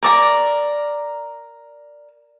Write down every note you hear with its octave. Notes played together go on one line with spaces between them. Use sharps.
A#4 D5 A#5